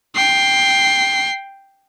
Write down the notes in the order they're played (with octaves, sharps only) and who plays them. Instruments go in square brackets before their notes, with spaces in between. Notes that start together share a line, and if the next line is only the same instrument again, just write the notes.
[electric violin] G5 C7